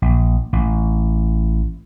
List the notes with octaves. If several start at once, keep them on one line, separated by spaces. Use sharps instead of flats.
A#1
A1